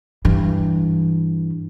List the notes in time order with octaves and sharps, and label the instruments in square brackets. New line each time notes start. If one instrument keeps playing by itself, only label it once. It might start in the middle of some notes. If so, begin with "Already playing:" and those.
[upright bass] G2 E3